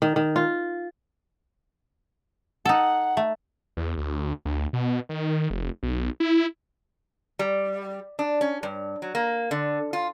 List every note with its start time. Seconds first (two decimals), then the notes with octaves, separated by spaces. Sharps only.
0.02 D#3
0.16 D#3
0.36 F4
2.65 D#4 A4 F#5
3.17 A3
3.77 E2
3.98 D2
4.46 D2
4.73 B2
5.09 D#3
5.50 F1
5.83 B1
6.20 E4
7.39 G3
8.19 D4
8.41 C#4
8.63 G2
9.02 F#3
9.15 A#3
9.51 D3
9.93 F4